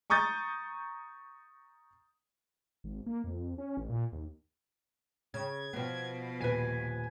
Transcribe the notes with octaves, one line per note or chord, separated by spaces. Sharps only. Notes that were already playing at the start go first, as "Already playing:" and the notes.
A#5 C#6 D#6 G6 A6
G#1
A#3
F2
C#4
A1
A#2
D#2
C#3 G#6
B2 F3 B3
D#1 B4 G#5